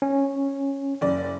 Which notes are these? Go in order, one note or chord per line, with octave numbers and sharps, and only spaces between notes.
C#4
F#1 D5